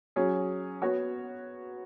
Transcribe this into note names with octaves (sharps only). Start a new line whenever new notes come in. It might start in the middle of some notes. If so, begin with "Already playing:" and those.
F#3 C#4 G#4
B3 F#4 C#5